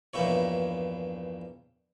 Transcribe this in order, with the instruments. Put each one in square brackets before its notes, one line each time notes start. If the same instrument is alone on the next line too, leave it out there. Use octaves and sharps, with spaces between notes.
[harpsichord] A#1 E2 G2 A#3 E4 C#5